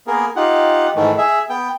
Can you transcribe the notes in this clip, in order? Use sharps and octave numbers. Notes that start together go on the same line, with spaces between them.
A#3 B3 G#4 A#4
D#4 F4 G4 F#5
G#2 D#3 E3 A3
G#4 E5
B3 G5